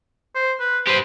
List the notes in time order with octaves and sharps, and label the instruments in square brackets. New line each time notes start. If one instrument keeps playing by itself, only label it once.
[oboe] C5
B4
[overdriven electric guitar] G4 B4 [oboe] C5